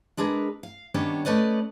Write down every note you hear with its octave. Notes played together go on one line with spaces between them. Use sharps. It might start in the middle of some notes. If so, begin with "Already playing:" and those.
G#3 D4 G#4 A#4 B4
F5
D#3 G3 B3 C#4 D4 C#5
A3 C#4 B4 D5 D#5